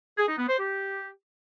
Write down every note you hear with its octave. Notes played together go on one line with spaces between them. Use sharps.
G#4
D#4
B3
C5
G4